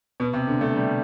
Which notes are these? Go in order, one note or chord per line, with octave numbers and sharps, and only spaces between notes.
B2
C3
D3
A3
G3